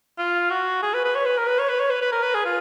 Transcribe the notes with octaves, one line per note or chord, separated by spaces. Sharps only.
F4
F#4
G#4
B4
B4
C#5
B4
A#4
B4
C#5
B4
C#5
B4
B4
A#4
B4
G#4
F4